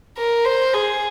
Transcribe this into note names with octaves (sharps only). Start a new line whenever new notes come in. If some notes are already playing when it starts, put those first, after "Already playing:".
A#4
C5
G#4